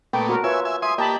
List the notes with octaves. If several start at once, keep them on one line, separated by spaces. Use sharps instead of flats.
A#2 A3 B3 G5
F#4 A#4
F4 B4 C#5 E5 G#5
E5 G#5
E5 G#5 C6 D#6
A#3 G4 D#5 A5 B5